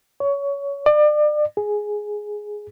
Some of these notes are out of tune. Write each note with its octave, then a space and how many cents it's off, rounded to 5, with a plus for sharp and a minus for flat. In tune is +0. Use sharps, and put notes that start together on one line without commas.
C#5 +20
D5 +35
G#4 +5